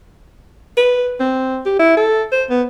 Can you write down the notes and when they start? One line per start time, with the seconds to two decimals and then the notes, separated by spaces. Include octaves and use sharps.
0.77 B4
1.20 C4
1.66 G4
1.80 E4
1.97 A4
2.32 C5
2.50 B3